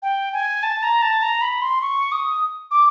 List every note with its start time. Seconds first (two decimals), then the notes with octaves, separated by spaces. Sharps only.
0.02 G5
0.33 G#5
0.63 A5
0.83 A#5
1.02 A5
1.22 A#5
1.42 B5
1.61 C6
1.82 C#6
2.12 D#6
2.71 D6